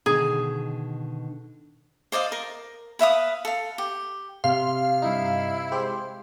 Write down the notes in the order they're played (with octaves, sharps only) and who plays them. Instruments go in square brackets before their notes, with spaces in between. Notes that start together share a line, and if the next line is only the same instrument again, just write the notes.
[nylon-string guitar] B2 D3 D#3 [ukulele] G#4
[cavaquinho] C5 D5 D#5 F5
A#4
B4 E5 F5 D#6
A4 F5
G4
[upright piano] C3 [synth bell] F5 [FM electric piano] C6
[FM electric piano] G2 D#4 [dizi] E4
[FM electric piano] G#3 G4 C5